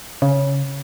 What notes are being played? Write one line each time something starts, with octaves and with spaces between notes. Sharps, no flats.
C#3